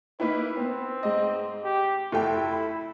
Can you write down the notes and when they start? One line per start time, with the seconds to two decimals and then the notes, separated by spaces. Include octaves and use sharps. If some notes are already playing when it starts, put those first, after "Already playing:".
0.20 A#3 D#4 E4 B4
0.57 B3 C4
1.03 G#2 D#5
1.64 G4
2.12 F1 E4 A4 G5
2.53 B5